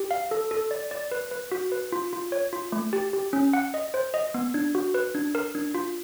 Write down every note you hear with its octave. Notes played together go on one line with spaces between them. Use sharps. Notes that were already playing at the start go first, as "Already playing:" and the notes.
Already playing: G4
F5
A4
A4
D5
D5
B4
B4
F#4
B4
F4
F4
C#5
F4
A3
G4
G4
C#4
F#5
D#5
C5
D#5
B3
D4
F#4
B4
D4
A#4
D4
F4